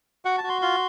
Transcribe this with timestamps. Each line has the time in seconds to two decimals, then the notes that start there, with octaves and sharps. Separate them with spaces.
0.25 F#4 F#5
0.38 A5
0.44 F#4
0.49 C6
0.62 F4 C6